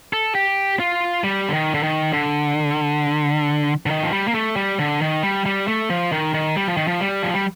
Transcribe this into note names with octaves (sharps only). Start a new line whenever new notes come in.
A4
G4
F4
G3
D3
D#3
D3
D#3
D3
D3
D#3
F3
G3
A#3
A3
G3
D3
D#3
G3
G3
A3
F3
D#3
D#3
G3
F3
D#3
F3
G3
F3
G3